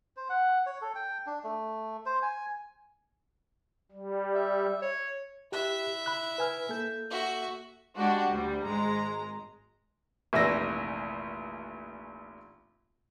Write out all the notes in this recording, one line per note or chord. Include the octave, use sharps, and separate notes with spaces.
C5
F#5
C#5
A4
G5
D4
A3
C5
G#5
G3
E5
C#5
E4 G4 E5 F#6
B5 F#6
B4 G#5 F6
A#3 A4 G6
F#4 E5
G#3 D4 F#4 G4
D2 G3
G#1 G#2 G#3 A#5
F1 A#1 E3 E6 A#6